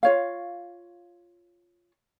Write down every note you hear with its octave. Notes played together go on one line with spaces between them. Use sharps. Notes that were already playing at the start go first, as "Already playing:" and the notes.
F4 C#5 F5